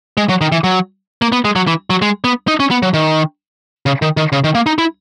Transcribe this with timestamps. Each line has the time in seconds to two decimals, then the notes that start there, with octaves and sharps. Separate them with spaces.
0.17 G#3
0.29 F#3
0.41 D#3
0.52 E3
0.64 F#3
1.22 A#3
1.32 B3
1.45 G#3
1.56 F#3
1.67 E3
1.90 F#3
2.02 G#3
2.24 B3
2.48 D#4
2.60 C#4
2.71 B3
2.83 F#3
2.94 D#3
3.86 C#3
4.02 D#3
4.17 D#3
4.32 C#3
4.44 D#3
4.55 A#3
4.66 D#4
4.78 E4